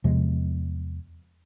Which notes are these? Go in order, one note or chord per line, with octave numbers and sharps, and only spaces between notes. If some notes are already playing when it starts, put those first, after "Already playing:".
E2 C3 F3 G#3